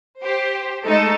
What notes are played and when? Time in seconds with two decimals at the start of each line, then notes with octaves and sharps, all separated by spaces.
0.22 G4 C5
0.85 G#3 A3 D#4 A4